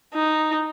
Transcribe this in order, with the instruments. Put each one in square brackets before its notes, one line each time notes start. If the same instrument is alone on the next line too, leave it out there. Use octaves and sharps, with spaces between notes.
[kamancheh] D#4